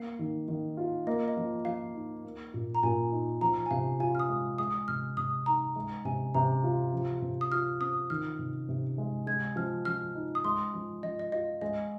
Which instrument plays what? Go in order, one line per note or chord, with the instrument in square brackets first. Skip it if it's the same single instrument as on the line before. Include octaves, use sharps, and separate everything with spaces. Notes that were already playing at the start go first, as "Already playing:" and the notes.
Already playing: [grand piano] A#3 [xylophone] F5
[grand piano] D#3
D#3
F4
[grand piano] A#3 [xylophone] D#5
[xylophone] D#5
[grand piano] F3
[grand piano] F3 [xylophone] F5
[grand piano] D#4
A#3
A#2
[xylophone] A#5
[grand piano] A#2 [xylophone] G#5
[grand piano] D#4
[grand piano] F3 [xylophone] A#5
[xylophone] G#5
[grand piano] C3 [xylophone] F5
[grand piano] F4 [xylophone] G#5
[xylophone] F6
D#6
[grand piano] G#3
[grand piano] G#3 [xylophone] D#6
[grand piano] C3 [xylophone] F6
[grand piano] C3 [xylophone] D#6
[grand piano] D#4 [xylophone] A#5
[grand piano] G#3
[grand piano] C3 [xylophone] G#5
[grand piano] C3 [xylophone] A#5
[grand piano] F4
F3
C3
[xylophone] D#6
[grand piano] F4 [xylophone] F6
[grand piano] C4 [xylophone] D#6
[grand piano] D#3 [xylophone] F6
[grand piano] C3
C3
G#3
[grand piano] G#3 [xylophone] G#6
[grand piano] F3 [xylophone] F6
[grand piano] F3 [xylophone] F6
[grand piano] D#4
[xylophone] D#6
[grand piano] G#3 [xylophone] C6
[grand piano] F3
[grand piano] F3 [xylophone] D#5
[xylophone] D#5
[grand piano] F4 [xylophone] D#5
[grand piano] G#3 [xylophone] D#5